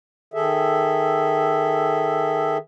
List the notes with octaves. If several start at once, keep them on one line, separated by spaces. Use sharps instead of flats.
D#3 G#4 A4 E5